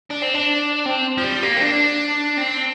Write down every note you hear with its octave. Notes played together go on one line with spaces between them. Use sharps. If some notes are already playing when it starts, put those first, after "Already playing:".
D4
C4
D4
C4
F3
G3
A#3
C4
D4
C4